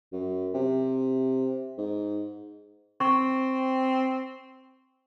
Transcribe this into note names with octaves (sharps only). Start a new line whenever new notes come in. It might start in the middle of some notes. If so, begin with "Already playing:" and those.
F#2
C3
G#2
C4 C#6